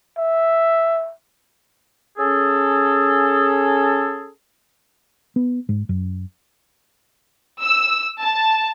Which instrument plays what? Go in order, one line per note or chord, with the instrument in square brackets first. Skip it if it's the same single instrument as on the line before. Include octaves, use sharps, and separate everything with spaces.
[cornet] E5
[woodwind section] C#4 G#4 A4
[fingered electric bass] B3
G#2
F#2
[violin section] E6
A5